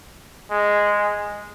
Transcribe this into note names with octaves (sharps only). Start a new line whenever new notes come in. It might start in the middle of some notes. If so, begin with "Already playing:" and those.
G#3